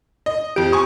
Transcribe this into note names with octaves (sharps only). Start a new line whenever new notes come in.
D#5
F2 G4 D7
G#5 C#6 D#6